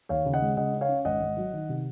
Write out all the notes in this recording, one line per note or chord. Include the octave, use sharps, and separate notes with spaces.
D#2 C#5 F5
C#3
D#5 F#5
G#3
C#3 D#5 F#5
C#4
C#5 F5
C#4
G#1 D#5 F#5
G#1
F#3
D#3
C3